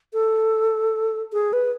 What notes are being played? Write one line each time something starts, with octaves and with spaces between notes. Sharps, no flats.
A4
G#4
B4